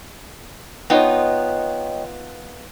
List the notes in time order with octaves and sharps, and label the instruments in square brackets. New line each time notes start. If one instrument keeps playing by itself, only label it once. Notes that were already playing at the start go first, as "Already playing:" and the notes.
[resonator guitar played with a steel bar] B3 D#4 F4 [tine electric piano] C#5 D#5 G5